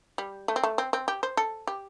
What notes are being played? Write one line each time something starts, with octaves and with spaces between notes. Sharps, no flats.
G3
A3
C4
A3
C4
C4
G4
C5
A4
G4